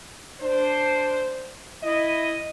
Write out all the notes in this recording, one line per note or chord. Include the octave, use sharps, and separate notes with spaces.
D4 C5
E4 D#5